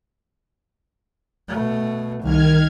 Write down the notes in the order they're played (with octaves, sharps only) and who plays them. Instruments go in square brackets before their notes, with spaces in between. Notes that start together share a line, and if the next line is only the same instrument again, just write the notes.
[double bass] B2 A3
[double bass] C2 [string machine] D#3 F6 G#6